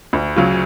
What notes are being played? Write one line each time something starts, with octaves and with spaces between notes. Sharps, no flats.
D2
C#3 F#3